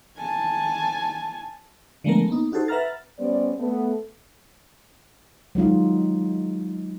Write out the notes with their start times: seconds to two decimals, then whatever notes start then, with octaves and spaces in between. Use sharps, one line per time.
0.18 G#5 A5
2.04 D3 F3 G#3 A3 B3 A#4
2.28 A#3 B3 D#4
2.52 D#4 F#4 G4 A4 C5
2.68 B4 E5 F#5 A#5 F6 A6
3.19 G3 B3 C#4 C5 D5
3.59 A3 B3
5.55 F#3 G#3 D#4 F4